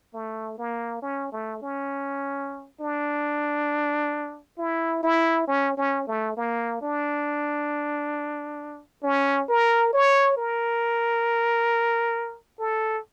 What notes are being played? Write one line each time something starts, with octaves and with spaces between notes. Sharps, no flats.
A3
A#3
C#4
A3
C#4
D4
E4
E4
C#4
C#4
A3
A#3
D4
C#4
A#4
C#5
A#4
A4